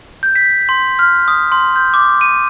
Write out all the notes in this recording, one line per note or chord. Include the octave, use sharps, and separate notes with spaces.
G6
B6
C6
F6
D#6
C6
G6
D6
D#7